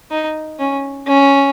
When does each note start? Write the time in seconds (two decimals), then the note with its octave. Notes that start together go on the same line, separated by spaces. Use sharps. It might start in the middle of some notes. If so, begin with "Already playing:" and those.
0.11 D#4
0.59 C#4
1.07 C#4